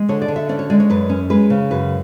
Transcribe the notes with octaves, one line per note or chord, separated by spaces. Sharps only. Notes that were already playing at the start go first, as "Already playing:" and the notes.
Already playing: G#3
D3 C#5
D5
D3
E5
C#4 D5
C#5
G#3 D5
C#5
F#2 B4
C#4
G#3 B4
C#3
F#2 B4